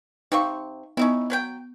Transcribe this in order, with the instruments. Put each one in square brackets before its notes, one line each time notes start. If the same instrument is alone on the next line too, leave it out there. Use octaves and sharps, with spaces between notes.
[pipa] C3 C4 C#6 [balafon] D#4 F5
[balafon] B3 [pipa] C#4 D#4 E4
[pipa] F#3 B4 G5